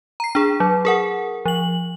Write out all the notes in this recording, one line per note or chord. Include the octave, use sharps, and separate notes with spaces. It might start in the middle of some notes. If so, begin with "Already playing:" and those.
A#5 C7
D4 G#4
F#3
G#4 A#4 F#5
F3 F#7